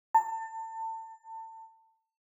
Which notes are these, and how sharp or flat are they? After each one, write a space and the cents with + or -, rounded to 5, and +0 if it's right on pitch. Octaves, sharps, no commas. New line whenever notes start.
A5 +30